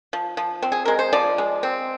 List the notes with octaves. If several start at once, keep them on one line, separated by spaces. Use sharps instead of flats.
F3
F3
C4
G#4
G#3 A#4
C5
F3 D5
G#3
C4